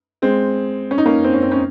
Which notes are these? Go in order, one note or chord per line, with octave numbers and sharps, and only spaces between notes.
G#3 C4
C#4
D#4
A#3 C#4
C4
C#4
C4
C#4